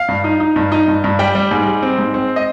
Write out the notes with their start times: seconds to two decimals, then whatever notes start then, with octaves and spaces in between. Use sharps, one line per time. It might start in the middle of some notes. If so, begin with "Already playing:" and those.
Already playing: F5
0.08 G2
0.24 D#4
0.40 D#4
0.56 G2
0.72 D#4
0.88 G2
1.04 G2
1.19 G3 G5
1.35 G3
1.51 G#2
1.66 G3
1.83 C4
1.98 G#2
2.14 C4
2.36 D#5